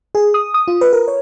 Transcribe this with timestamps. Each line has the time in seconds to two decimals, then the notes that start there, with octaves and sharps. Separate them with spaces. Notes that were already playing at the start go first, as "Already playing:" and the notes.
0.15 G#4
0.34 D#6
0.54 D#6
0.68 F4
0.81 B4
0.93 A#4
1.08 C#5